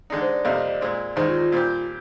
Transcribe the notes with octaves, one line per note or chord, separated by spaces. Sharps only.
D3 G#3 D#4 D5
C5
D5
F2 C3 G3 A#3 D#5
D#5
D5
A#2 G#3 C4
D#2 D#3 G#3 D#4 C5
F4
F4
A#2 G3 C4 G4